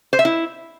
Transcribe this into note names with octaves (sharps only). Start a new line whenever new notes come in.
C5
E5
E4